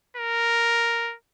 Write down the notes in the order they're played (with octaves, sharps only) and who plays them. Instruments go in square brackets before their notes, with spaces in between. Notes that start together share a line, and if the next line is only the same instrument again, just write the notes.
[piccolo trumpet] A#4